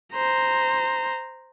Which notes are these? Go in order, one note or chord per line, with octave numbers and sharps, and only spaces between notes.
C5 A#5